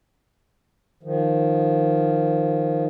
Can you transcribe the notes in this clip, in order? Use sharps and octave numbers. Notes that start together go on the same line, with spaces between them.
D#3 F3